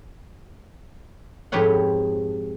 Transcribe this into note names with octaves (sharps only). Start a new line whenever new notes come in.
F2 G#2 G4 B4 C#5 F#5